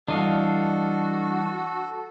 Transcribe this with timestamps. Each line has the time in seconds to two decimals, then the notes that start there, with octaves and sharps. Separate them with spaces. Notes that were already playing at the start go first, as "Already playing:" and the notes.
0.08 E3 G3 D4 F#4 A4 D#5 F5